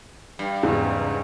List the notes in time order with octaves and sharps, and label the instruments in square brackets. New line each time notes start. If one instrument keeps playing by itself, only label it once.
[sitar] G2
[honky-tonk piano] E2 G#2 C#3